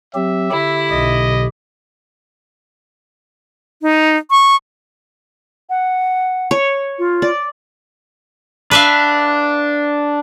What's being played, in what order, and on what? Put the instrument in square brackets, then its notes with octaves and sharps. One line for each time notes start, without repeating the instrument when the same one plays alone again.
[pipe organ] F#3 C4 G4 [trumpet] E5
[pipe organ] D3 G4 [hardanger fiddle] E4
[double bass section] B1 [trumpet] D#5
[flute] D#4
C#6
F#5
[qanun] C#5
[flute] F4
[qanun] D5
[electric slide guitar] D4 [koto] B4 E5 F5